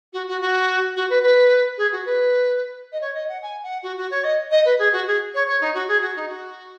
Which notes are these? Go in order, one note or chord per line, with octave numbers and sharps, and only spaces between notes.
F#4
F#4
F#4
F#4
B4
B4
G#4
F#4
B4
D#5
C#5
D#5
F#5
G#5
F#5
F#4
F#4
C#5
D#5
D#5
B4
G#4
F#4
G#4
C#5
C#5
D#4
F#4
G#4
F#4
D#4
F#4